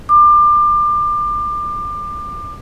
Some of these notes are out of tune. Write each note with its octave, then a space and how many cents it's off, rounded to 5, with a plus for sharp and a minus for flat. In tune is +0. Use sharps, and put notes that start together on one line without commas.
D6 +30